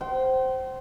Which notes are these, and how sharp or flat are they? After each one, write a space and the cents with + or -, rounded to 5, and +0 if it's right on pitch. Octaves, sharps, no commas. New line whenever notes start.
C5 +0 G5 -40